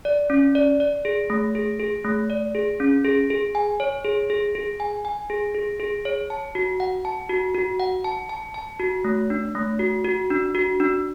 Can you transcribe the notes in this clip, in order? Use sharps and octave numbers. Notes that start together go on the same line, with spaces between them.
D5
C#4
D5
D5
G#4
A3
G#4
G#4
A3
D5
G#4
C#4
G#4
G#4
G#5
C#5
G#4
G#4
G#4
G#5
G#5
G#4
G#4
G#4
C#5
A5
F#4
F#5
A5
F#4
F#4
F#5
A5
A5
A5
F#4
A3
D4
A3
F#4
F#4
D4
F#4
D4